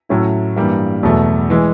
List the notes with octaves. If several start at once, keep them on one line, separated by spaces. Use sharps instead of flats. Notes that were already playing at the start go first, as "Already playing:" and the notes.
A2 F#3 A3 C#4 E4
G2 E3 G3 A#3
E2 B2 F#3 A3
E3 G#3